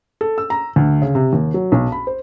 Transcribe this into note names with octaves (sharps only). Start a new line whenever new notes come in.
A4
E6
A#5
D2
C#3
C3
D#2
F#3
B1
B5
C5